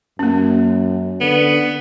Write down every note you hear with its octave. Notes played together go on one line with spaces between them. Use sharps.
F#2 A#3 C#4
D3 B3